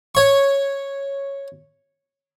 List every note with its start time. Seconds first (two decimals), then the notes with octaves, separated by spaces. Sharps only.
0.15 C#5 C#6